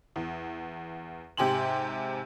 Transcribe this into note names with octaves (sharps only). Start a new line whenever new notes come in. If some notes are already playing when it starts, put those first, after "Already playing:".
E2
G#2 C3 G4 G#5 C6 F#7